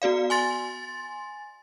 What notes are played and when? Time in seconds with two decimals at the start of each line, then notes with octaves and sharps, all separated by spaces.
0.02 B3 F#4 D5 F5
0.30 G#5 C6 A6